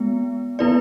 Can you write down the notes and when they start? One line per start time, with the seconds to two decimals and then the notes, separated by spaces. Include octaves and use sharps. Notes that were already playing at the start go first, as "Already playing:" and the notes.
Already playing: G#3 B3
0.59 B3 E4 B4 D5